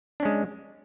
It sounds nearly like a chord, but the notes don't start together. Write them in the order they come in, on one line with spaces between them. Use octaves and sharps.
D4 C#4 G#3